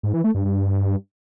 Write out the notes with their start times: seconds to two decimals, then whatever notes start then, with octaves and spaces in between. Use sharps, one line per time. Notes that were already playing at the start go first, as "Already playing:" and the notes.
0.03 G#2
0.14 E3
0.24 A3
0.35 G2
0.45 G2